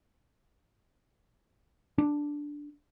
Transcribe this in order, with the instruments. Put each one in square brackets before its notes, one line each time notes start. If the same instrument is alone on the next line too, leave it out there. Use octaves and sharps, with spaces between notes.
[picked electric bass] D4